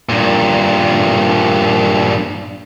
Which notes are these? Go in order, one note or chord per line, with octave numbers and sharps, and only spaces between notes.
G2 A#2